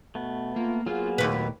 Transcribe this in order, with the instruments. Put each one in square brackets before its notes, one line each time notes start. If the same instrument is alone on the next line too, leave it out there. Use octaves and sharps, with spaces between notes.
[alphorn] B2 [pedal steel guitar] A3 B3
[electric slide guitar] A#3 [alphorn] F4
[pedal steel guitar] F#3 A#3 B3 [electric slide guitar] F4 [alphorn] G#4
[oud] D#2 B4 [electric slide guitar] A#2 A3